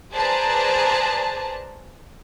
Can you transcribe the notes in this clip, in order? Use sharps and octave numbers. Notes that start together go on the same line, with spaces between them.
G#4 B4 C5 D5 A5 A#5